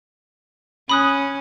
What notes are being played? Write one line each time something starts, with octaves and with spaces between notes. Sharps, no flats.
C#4 B5 D#6 F#6